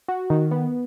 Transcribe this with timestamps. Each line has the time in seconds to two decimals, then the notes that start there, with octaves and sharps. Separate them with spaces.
0.08 F#4
0.30 D#3
0.51 B3